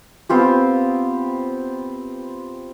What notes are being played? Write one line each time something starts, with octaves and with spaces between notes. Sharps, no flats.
B3 C4 F4 G4